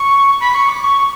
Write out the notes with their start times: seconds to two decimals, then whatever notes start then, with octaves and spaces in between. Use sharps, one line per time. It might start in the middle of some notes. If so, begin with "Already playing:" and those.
Already playing: C#6
0.40 B5
0.54 C#6
0.68 D6
0.83 C#6